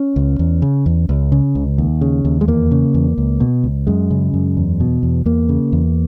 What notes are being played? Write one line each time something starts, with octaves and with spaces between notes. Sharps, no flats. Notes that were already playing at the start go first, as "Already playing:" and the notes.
Already playing: C#4
C#2
E2
C#3
E2
C#2
C#3
C#2
D#2
C#3
D#2
G#3
E2 A#3
C#3
E2
C#2
B2
C#2
F#2 G#3
C#3
F#2
E2
B2
E2
E2 A#3
C#3
E2